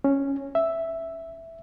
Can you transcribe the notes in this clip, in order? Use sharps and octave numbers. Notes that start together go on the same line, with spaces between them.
C#4
E5